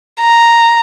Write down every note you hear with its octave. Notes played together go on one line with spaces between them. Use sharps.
A#5